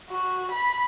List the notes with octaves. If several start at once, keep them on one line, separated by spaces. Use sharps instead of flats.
F#4
B5